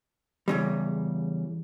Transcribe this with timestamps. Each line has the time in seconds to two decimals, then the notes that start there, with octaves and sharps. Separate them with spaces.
0.48 E2 C#3 G3